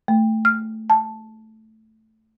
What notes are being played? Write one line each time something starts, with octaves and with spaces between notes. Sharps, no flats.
A3
F6
A5